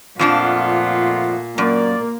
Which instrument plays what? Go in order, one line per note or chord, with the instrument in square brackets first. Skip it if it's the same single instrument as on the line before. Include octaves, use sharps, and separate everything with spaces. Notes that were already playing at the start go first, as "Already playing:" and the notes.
[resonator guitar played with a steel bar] F2 F3 D4 [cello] A#2 [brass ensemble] A3 F4 F#5
[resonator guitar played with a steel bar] F#2 [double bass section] A#3 [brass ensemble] D5